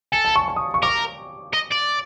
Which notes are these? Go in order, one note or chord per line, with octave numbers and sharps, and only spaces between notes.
A4 G#5
A5
C#6
C#6
D#6
C#6
A#4 D6
D#5
D5